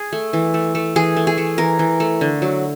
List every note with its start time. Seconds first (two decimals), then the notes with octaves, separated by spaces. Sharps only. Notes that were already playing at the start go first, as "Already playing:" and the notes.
Already playing: G#4
0.13 A3
0.33 E3
0.54 A3
0.75 A3
0.96 E3 G#4
1.16 A3
1.27 G#4
1.38 A3
1.58 E3 A#4
1.79 E3
2.00 A3
2.21 D3
2.42 F#3